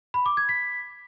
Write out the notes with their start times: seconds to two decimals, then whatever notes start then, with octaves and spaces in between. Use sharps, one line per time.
0.14 B5
0.26 D6
0.37 G#6
0.49 B6